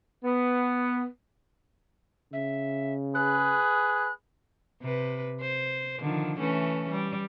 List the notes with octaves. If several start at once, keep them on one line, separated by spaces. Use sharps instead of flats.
B3
C#3 E5
G#4 B4 F#6
C3 B4
C5
D3 D#3 F3
E3 A3 C#4
G3